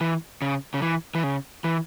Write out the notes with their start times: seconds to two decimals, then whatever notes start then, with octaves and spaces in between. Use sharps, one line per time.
0.01 E3
0.42 C#3
0.74 C#3
0.82 E3
1.15 E3
1.24 C#3
1.64 E3